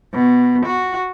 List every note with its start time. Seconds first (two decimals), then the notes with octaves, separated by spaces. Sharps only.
0.14 B2
0.66 F#4